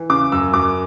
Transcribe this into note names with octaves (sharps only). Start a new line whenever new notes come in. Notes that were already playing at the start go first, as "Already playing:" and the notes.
Already playing: E3
C#3 D6
F#2 E6
F#2 D6